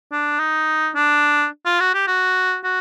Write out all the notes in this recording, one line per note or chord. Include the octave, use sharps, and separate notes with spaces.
D4
D#4
D4
F4
F#4
G4
F#4
F#4